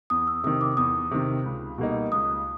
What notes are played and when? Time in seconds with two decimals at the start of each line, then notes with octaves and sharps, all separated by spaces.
0.10 E2 D#6
0.27 E6
0.44 C3 D#3 D#6
0.61 D6
0.77 E2 D#6
1.11 C3 D#3
1.45 C#2
1.78 B2 G3 A#3 D#4
2.12 C#2 D#6